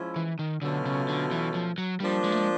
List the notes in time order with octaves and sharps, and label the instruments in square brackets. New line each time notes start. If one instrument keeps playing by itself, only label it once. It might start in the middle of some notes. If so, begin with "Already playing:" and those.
Already playing: [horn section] F3 G#3 C#4 E4
[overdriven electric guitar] E3
D#3
[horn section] B2 F#3 A3 C#4 F4 [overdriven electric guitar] D3
[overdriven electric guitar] C#3
D3
E3
F3
F#3
[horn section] F3 A#3 D4 [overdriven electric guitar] G3
[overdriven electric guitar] G#3
A3
G#3